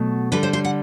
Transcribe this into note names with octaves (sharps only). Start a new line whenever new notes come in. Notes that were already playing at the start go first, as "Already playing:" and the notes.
Already playing: B2 F#3 A3
D3 G3 B4
C5
C5
F#5